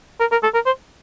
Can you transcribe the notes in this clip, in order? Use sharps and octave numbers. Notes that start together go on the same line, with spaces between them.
A#4
A#4
A4
A#4
C5